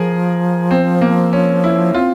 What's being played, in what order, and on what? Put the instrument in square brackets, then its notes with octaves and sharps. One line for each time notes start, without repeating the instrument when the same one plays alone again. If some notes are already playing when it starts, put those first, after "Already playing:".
Already playing: [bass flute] F3 [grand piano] G#4 A#4
[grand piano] C4
A#3
C#4
E4
[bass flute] C4 [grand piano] F4